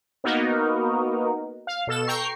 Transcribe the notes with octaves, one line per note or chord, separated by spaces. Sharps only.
A#3 B3 D#4 F#4 A#4
F5
B2 A4 E7
G5 A#5 C#6 C7